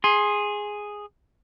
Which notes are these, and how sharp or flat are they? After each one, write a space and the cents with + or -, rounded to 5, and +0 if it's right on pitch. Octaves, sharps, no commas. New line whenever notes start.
G#4 -5 C6 +20